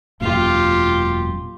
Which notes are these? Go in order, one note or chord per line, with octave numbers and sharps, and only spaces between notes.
E1 F#2 A#2 F4 G4